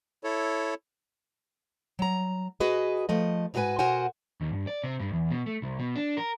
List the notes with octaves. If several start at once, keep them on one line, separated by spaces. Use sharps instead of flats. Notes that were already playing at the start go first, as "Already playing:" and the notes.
E4 A4 C#5
F#3 A#5
F#4 G#4 B4 D#5
F3 A3 D#5
G#2 D#4 F#4 G#4 B4 G#5
B2 F#4 A#4 C5 F#5 G#5
D#2
G2
D5
C3
G2
E2
B2
A3
C2
B2
D4
A#4